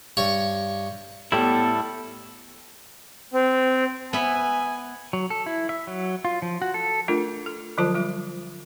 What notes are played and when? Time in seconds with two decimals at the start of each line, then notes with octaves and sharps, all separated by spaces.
0.17 G2 C#5 C#6
1.32 A2 G3 B3 E4 G4 A4
3.34 C4
4.13 B3 E5 G#5
5.13 F#3
5.30 A4
5.46 E4
5.69 E5
5.87 F#3
6.25 F4
6.42 F3
6.62 F#4
6.74 A4
7.08 A3 D4 F4 A4 A#4
7.46 A4
7.78 D3 F3 F#3 F4 C5 A5
7.94 G3 F4